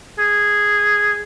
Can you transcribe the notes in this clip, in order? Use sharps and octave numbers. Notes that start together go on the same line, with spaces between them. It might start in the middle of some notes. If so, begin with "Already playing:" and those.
G#4